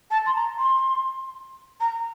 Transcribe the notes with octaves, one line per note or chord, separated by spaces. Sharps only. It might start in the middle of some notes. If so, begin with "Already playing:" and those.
A5
C6
A#5
C6
A#5